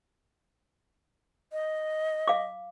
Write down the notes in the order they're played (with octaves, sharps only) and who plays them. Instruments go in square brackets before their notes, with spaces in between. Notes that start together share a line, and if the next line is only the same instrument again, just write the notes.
[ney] D#5
[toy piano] F5 D6